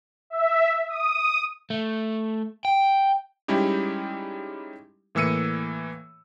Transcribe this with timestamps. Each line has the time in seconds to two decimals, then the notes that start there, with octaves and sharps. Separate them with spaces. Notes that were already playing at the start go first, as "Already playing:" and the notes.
0.30 E5
0.89 D#6
1.70 A3
2.65 G5
3.48 G3 G#3 C#4 D#4 E4 G4
5.15 A2 E3 A#3 E6 C#7 D#7